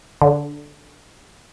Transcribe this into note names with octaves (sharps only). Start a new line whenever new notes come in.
D3